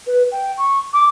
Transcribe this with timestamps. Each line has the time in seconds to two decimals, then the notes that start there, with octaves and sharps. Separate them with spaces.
0.06 B4
0.31 G5
0.57 C#6
0.93 D6